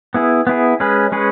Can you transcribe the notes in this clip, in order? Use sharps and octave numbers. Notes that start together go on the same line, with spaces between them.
B3 E4 G#4
B3 E4 G#4
G#3 C#4 G#4 B4
G#3 C#4 G#4 B4